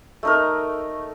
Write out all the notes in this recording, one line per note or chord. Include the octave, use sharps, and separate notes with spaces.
A3 D#4 A#4